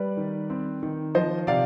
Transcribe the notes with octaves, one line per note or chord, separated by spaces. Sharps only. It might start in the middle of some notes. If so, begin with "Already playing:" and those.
Already playing: G3 B4 D5
D#3
C4
D#3
F3 C5 D#5
C3 D5 F5